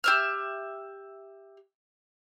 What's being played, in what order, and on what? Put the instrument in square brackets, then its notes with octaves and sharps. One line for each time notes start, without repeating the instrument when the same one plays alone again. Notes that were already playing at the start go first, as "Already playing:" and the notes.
[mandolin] G4 E5 F6